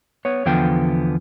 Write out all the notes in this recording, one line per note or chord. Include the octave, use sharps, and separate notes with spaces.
B3 C#5
E2 D3 F3 B3 G5